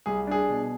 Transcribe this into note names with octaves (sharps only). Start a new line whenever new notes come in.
C2 G#4
D4 G#4
B2